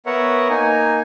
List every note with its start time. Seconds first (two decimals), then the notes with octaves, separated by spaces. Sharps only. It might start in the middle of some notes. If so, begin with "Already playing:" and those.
0.06 B3 A#4 B4 C#5 E5 F#5
0.50 A#3 D#4 G#5